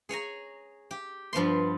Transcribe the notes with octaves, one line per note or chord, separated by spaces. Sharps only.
G#4 C#5 G#5 A#5
G4
G2 F3 B3 C6